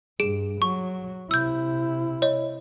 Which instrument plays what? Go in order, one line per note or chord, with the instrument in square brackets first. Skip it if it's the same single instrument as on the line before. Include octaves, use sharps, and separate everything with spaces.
[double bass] G2 [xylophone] G#4 D7
[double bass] F#3 [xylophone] C#6
[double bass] C3 E4 [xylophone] E6 G6
[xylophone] C#5 D#5